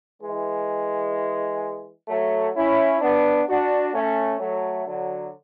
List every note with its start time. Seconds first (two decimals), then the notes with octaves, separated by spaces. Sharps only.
0.22 E3 G#3
2.08 F#3 A3
2.54 C#4 E4
3.01 B3 D4
3.48 D4 F#4
3.93 A3 C#4
4.40 F#3 A3
4.87 D3 F#3